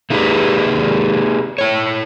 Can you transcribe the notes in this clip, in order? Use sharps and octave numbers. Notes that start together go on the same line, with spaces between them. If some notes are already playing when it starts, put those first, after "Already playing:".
A3 A#3 D#4 G4 G#4 B4
E4 C#5